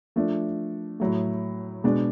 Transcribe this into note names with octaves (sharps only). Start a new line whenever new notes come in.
F3 A3 D4
A2 F#3 A3
B2 G#3 D4